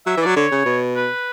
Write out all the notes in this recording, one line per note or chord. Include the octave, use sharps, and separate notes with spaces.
F#3 E5
E3
F#3 D5
D3 C#5
C#3
B2
B4